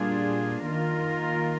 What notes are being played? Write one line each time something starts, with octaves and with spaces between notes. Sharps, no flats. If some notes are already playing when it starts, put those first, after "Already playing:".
Already playing: A#2 G3 D4 F4 G#4
D#3 A#3 F4 A#4